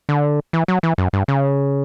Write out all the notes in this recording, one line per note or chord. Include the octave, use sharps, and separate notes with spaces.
D3
E3
F#3
E3
F#2
G2
C#3